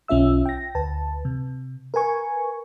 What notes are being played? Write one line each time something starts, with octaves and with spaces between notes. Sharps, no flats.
B1 C#4 F4 E5 E6
G5 A#6
D2 B4 A5
C3
A#4 B4 G#5 C#6